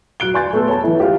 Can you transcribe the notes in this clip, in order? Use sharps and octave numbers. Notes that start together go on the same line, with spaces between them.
F#3 F#6 D7 G7
D5 G#5 C6 G6 A6
A3 B3 A4
C#5 A5
E3 E4
F4 G4